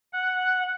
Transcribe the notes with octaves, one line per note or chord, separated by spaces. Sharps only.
F#5